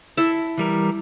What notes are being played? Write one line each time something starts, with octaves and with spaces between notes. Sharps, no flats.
E4 A4
E3 G3 A#4